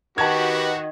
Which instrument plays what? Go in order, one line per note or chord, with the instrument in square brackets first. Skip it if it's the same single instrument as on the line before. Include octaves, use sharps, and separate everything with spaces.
[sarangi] D#3 [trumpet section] F#4 [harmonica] G4 B4 [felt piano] A5 G#6